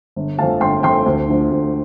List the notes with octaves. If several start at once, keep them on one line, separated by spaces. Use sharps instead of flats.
G1
F2 F3 A3 F5 A5
G1 G5 C6
F2 F3 A3 G5 C6
D2
D3 F3 A3
D2